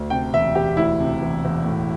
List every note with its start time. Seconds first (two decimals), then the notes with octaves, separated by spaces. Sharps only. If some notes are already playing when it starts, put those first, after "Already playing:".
Already playing: D2
0.10 C3 G5
0.34 E1 E5
0.55 E1 G4
0.77 D2 E4
1.00 C3
1.22 E1
1.45 E1
1.66 A2